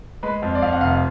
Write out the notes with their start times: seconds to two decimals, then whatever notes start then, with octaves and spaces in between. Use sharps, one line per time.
0.23 G#3 B4
0.43 F2
0.55 D5
0.62 F2 F5
0.73 F#5
0.81 F1 F5